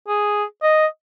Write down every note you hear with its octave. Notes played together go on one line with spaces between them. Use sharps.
G#4
D#5